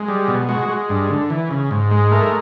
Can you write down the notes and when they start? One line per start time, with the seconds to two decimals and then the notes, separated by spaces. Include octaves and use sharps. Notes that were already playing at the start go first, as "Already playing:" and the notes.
Already playing: G#3
0.08 G3
0.28 B2
0.49 G#3 F#4
0.69 G#3
0.89 G2
1.10 D3
1.30 E3
1.51 C#3
1.71 G#2
1.91 G#3
2.11 A3 A#4